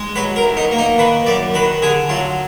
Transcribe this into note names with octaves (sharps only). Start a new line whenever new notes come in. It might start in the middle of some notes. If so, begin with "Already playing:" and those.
Already playing: G#3
F#3 B4
A#4
B1
D#4
A#3
D#4
D#3 B4
F#2 D5
D#3 B4
D3 G#4
F#3 F4